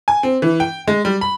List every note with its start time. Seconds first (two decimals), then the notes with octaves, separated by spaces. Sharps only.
0.08 G#5
0.23 C4
0.42 E3
0.60 G5
0.88 G#3
1.05 G3
1.21 B5